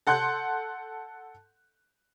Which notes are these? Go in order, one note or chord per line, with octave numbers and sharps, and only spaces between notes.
A4 F#5 C6 F#6 G6